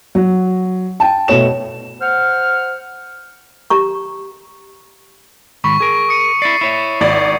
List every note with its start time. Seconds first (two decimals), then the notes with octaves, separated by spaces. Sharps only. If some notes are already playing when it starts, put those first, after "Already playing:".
0.15 F#3
1.00 G5 A5
1.28 B2 A3 C#5 E7
2.01 C5 F#5 F6
3.70 G4 A#5 C#6
5.64 G#2 D#3 B5 C#6
5.80 G#4 A#4
6.08 D#6 C#7 D#7
6.42 E4 D5 A6 C7
6.61 E4 C#5 E5
7.01 G#1 D5